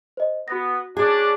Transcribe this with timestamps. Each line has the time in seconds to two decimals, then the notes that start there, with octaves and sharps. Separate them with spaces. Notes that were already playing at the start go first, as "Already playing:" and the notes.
0.17 C5 D#5
0.48 B3 F#4 A#6
0.97 C#4 D4 G#4